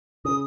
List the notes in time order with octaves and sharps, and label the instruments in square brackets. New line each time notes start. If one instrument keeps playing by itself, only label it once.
[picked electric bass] C#3 [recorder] D#6